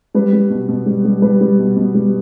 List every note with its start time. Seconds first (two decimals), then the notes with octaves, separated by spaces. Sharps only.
0.15 G3 B4
0.33 G3
0.50 B2
0.68 B2
0.86 G3
1.05 G3
1.22 G3 B4
1.41 G3
1.59 B2
1.76 B2
1.95 G3